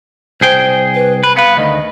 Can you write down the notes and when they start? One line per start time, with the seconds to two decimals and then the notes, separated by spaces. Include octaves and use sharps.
0.41 C2 G#4 C5 G5
0.95 B4
1.23 B4 B5
1.37 B3 B4 F5
1.57 D2 D#3 D#5